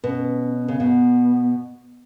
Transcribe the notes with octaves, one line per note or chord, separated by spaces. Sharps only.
B2 C#4
C#3
B2 B3